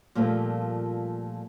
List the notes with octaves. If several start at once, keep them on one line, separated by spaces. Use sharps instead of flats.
A#2 F3 G3 A3 A#3 C4